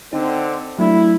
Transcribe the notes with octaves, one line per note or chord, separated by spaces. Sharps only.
D3 C4 D#4
F#3 A3 D4 E4